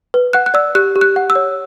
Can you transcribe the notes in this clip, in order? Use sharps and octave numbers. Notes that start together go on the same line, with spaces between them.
B4
F#5 F#6
F#6
D5 E6
G4 F#6
G4
F#6
F#5
E6
C#5